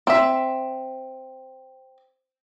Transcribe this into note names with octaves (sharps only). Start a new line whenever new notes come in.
C4 E5